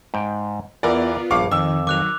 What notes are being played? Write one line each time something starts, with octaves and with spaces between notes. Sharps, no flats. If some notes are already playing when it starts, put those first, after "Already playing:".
G#2 G5
E2 E3 B3 F4 A#4 D5
A#1 G2 F5 C#6 D6
F2 D#3 D6 E6
D#3 F#3 D6 F#6 F7